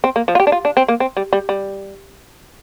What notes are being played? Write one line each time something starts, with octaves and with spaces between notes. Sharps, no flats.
C4
A#3
F3
F4
G4
D4
F4
D4
C4
A#3
C4
G3
G3
G3